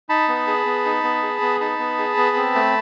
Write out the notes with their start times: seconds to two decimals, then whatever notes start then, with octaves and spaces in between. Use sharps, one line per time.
0.09 D#4 A5 B5
0.29 B3
0.47 G#4
0.66 B3
0.85 D#4
1.04 B3
1.23 G#4
1.42 B3
1.60 D#4 A5 B5
1.79 B3
1.98 G#4
2.17 B3
2.36 C4
2.55 A3